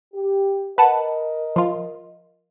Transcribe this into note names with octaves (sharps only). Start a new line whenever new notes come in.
G4
A#4 B4 D#5 F#5 A5
F3 F4